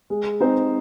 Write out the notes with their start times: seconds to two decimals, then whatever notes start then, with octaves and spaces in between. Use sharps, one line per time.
0.10 G#3
0.41 C4 D#4 G#4 C5